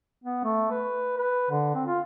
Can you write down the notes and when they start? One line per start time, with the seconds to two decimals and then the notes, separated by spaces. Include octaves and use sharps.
0.24 B3
0.44 A3
0.71 B4
1.18 B4
1.50 D3
1.75 C4
1.87 F4